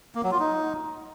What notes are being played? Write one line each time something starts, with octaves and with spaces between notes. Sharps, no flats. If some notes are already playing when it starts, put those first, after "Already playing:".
A#3
F#3
F4
D#4